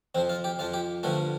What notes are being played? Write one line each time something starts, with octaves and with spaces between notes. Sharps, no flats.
F2 F3 C4
F4
G4
F2 F3 F4
G4
G2 D3 F3 A3